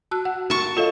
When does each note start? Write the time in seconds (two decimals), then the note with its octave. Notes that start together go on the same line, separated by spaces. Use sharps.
0.11 F#4 A5 E6 F#6
0.25 F#5
0.50 A#4 A5 C#6
0.77 F4 A4 C#5 D#5 F5